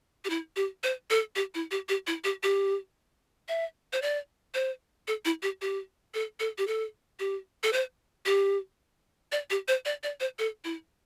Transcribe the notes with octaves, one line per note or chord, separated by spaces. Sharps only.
G4
E4
G4
C5
A4
G4
E4
G4
G4
E4
G4
G4
E5
C5
D5
C5
A4
E4
G4
G4
A4
A4
G4
A4
G4
A4
C5
G4
D5
G4
C5
D5
D5
C5
A4
E4